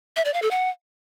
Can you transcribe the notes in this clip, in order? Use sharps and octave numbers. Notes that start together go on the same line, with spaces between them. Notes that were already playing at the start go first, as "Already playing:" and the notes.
E5
D5
F5
A4
F#5